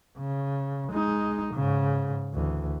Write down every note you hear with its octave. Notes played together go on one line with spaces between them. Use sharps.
C#3
G#3 D#4
G#2 C#3
D2 E3